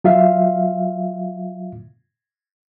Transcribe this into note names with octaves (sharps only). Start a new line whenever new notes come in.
F#3 F4 E5 F5